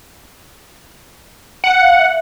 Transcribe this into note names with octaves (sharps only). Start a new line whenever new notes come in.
F#5
F5
E5